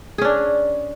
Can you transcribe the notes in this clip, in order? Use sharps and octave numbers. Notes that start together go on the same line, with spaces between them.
C#4 D4 G#4